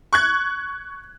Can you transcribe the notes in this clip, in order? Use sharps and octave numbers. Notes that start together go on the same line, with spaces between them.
C#6 F#6 G#6